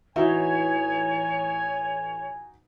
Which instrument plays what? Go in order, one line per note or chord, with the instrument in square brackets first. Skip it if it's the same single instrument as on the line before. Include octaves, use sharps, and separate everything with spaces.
[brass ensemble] A1 G#5 [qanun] E3 [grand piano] D#4 F#4 E5 [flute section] C#5